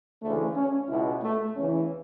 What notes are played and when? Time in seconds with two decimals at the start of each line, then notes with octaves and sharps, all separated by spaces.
0.23 D2 C#3 E3 A3
0.56 C#4
0.89 C#2 B2 E4
1.23 A3
1.56 E2 C#3 E3 C#4